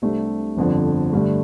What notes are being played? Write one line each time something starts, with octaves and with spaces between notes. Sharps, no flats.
C2 C3 A3 D4
G1 F2 D3 F3
G2 D3 A3